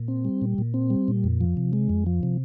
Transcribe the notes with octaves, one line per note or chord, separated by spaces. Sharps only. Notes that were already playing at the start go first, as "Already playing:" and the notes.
Already playing: A#2
C4
G3
A#2
A#2
C4
G3
A#2
F2
F3
C3
G#3
F2
F3
C3